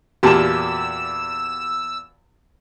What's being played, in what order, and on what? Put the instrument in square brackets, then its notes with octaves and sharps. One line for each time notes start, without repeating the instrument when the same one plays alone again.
[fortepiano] E2 A#2 [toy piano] F#4 G#5 A5 [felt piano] G4 E7 [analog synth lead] E6